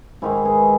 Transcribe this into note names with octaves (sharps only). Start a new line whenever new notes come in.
G#2 D#3 G#3 E4 G#4
G#4 B4